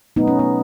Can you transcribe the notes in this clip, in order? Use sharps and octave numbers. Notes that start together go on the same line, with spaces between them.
B2 F#3 A3 B3 D#4
C#4
B3